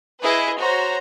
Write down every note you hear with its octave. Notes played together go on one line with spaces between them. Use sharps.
E4 G#4 B4 D#5
F#4 C5 C#5 A#5